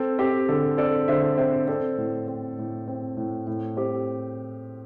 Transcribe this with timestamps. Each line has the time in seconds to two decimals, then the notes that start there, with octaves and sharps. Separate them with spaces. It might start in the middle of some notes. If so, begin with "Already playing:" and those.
Already playing: C4 A4
0.19 C4 G4
0.48 D3 A4
0.78 C4 A4 D5
1.08 D3 C5 E5
1.38 C4 C5 E5
1.68 C4 A4 D5
1.97 A2
2.28 C4
2.58 A2
2.88 C4
3.17 A2
3.47 A2
3.77 C4 G4 C5